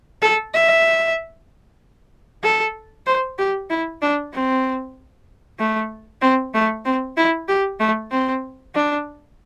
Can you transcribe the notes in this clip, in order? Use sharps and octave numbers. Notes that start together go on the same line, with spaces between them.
A4
E5
A4
C5
G4
E4
D4
C4
A3
C4
A3
C4
E4
G4
A3
C4
D4